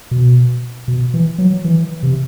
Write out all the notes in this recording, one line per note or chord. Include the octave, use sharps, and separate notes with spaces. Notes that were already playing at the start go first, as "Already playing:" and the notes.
B2
B2
E3
F#3
E3
C3